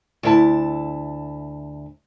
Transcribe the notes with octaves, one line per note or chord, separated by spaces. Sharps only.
D2 E4 A5